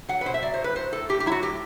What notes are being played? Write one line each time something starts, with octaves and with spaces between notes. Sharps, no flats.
F#3 F#5
B4
B2 C5
E5
F#3 D5
C5
A2 B4
F#3 C5
A2 A4
A2 G4
G4
F#3 E4
F#4
A2 G4